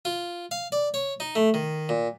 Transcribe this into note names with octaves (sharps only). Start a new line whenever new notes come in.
F4
F5
D5
C#5
D#4
A3
D#3
A#2